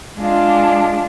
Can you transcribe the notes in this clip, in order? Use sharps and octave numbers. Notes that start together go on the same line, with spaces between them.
G#3 D4 F4